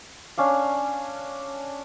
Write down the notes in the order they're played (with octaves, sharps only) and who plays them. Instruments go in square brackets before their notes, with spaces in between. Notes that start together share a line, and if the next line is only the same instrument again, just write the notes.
[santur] C#4 D4 F5